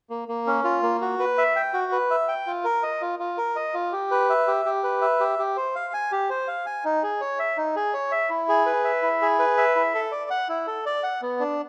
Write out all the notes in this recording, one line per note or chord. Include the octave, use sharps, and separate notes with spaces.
A#3
A#3
C#4
F4
A#3
F#4
B4
E5
G5
F#4
B4
E5
G5
F4
A#4
D#5
F4
F4
A#4
D#5
F4
G4
B4
E5
G4
G4
B4
E5
G4
G4
C5
F5
G#5
G4
C5
F5
G#5
D#4
G#4
C#5
E5
D#4
G#4
C#5
E5
E4
G#4
B4
E5
E4
G#4
B4
E5
E4
A4
D5
F#5
E4
A4
D5
F#5
B3
D4